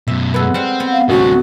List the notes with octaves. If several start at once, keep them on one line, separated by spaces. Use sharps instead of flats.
F#2 B2 E5
F#3 G#3 A4 B4
G3 C4 F#5
B3
F5
A1 D2 G3 C4 F#4